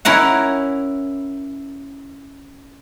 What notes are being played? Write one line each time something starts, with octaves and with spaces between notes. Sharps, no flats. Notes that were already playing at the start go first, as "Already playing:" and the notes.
C#4 E4 A#4 F#5